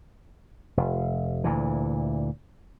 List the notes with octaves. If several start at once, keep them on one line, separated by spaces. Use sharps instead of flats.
F1
D2 A#2 E3